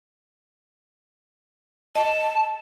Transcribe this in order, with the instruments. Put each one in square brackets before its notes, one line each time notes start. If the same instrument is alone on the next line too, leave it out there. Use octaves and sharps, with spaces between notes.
[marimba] D#5 [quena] A5